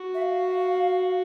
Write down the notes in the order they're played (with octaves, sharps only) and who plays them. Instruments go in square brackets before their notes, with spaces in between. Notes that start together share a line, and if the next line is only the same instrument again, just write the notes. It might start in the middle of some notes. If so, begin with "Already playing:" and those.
Already playing: [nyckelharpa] F#4
[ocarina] E5
F5